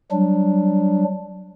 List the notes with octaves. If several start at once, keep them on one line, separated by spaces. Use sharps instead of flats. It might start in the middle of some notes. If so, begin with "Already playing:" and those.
F#3 G3 D4